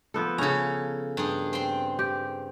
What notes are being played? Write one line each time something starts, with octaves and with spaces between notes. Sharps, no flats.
F3 B3 A4
C#3 C#4 A4 A#5
G2 G#4
C4 C6
G4